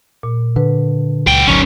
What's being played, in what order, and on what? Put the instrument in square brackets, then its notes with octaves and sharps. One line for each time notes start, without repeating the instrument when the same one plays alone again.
[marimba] A#2
[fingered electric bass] D3 [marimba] B4
[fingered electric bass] C#2 [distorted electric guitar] F#3 G5
[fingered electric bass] G1 D2 F#3 [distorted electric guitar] D#3 C#4